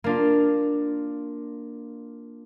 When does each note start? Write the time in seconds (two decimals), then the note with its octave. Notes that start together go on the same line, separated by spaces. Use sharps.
0.04 A#3 D4 F4